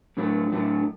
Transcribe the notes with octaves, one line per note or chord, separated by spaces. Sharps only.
A2 F#3 A3 D4
A2 F#3 A3 D4